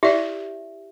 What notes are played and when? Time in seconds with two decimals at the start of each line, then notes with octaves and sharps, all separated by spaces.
0.03 E4 G4 D5 E5